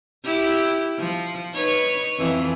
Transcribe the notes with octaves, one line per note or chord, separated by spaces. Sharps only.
E4 G4
F3
D#4 B4 C#5
F2 E3